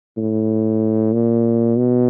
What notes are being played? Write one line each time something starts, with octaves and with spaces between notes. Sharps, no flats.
A2
A#2
B2